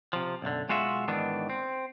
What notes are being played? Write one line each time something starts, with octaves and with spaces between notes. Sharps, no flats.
C3 F3
B1 F#2 D3
B1 G#3 F4 F#4 E5
G#2 D#3 E3 B3 D4
C4